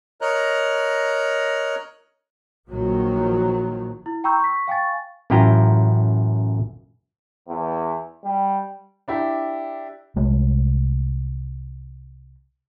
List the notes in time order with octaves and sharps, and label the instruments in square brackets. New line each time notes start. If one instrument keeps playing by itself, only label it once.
[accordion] A#4 C#5 D#5 A#5 F#6
[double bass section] A#1 D#3 F3 F#3
[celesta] E4
G5 A#5 B5 C#6 E6 G6
C#6 B6
F5 G5 G#5 C#6 A6
[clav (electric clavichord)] A1 F#2 E4 F4 G5 A#5
[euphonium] E2
G3
[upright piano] D4 E4 G4
[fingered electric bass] C2 G#3 A3